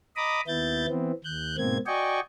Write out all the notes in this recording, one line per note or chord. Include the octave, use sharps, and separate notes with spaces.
D#5 A#5 B5 D6 D#6
D#2 B3 E4 G6 A6
E3 B3 C4
D#2 F#6 G6
G#2 B2 A#3 C4 G#6
F#4 D5 D#5 G5 G#5 C#6